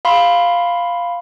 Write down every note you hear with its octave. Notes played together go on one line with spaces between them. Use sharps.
F5 B5 C6